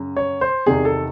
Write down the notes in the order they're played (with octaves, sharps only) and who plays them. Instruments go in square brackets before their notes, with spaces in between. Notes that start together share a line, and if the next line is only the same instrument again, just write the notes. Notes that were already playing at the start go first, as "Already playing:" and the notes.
Already playing: [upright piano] F#2 C#3
C#5
C5
E2 C3 D#3 G#4
A4